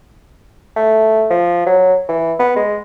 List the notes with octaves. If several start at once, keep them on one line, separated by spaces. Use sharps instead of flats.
A3
F3
F#3
E3
B3
G#3